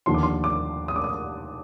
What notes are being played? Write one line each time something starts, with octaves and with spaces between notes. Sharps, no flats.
D#2 D3 F3 C6
D6
C6
D6
D#6
D6
D#6